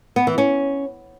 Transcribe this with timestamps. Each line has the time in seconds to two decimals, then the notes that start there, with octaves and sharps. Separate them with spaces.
0.16 B3
0.27 E3
0.38 C#4